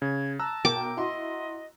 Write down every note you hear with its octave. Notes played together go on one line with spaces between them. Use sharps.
C#3 G#6
A5 A#5 E6 F#6
B1 A#4 G5 D6
E4 F#4 D#5 C6